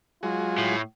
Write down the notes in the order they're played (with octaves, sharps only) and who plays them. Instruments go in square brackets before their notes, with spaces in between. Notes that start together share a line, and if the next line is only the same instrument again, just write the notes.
[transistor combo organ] F#3 G#3 [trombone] F4
[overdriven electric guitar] A2